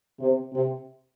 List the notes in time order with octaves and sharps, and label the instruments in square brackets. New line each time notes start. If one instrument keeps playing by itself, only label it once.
[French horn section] C3
C3